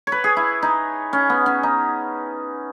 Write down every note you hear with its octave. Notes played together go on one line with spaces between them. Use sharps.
C#5
B4
G#4
E4
D#4
C#4
B3
C#4
D#4